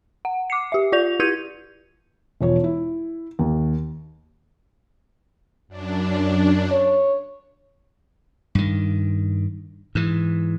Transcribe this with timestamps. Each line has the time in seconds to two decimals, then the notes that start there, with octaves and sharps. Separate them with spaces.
0.25 F#5
0.50 D6 C7 C#7
0.72 G4 E5
0.92 F4 D5 G6 F7
1.20 E4 G4 G6 G#6 C#7 D#7
2.41 E1 F3 C#5
2.64 E4
3.39 D#2
5.68 F#2 D4
6.72 C#5
8.55 G2 D#3
9.95 G#2 E3